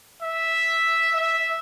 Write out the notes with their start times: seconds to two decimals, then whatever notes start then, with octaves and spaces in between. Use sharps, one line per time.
0.22 E5
1.15 E5